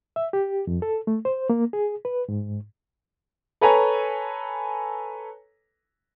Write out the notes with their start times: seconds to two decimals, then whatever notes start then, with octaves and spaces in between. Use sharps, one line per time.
0.16 E5
0.33 G4
0.67 F2
0.82 A4
1.07 A3
1.25 C5
1.50 A#3
1.73 G#4
2.05 B4
2.29 G#2
3.61 A4 B4 C#5 G#5 A#5